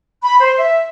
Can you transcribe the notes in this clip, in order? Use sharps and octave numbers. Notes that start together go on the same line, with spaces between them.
B5
C5
E5